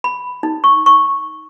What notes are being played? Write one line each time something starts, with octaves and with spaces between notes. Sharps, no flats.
B5
D#4
C#6
C#6